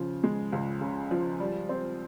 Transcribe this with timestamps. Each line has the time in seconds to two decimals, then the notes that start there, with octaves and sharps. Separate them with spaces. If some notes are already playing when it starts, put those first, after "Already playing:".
Already playing: C#3 F3
0.24 G#3
0.53 C#2
0.81 C#3
1.11 F3
1.40 G3
1.69 C4